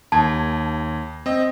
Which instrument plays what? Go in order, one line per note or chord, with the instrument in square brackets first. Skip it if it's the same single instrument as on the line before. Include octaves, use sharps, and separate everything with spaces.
[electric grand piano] D#2 G#6 [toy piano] A5
[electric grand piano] C4 D#5